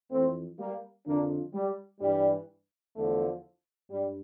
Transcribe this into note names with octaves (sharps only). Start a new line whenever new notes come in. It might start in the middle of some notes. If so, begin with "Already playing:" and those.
F2 E3 A3 C4
G3 A#3
F2 D3 F3 A#3 D4
G3
G2 E3 G3
E2 D3 F3 A3
G2 G3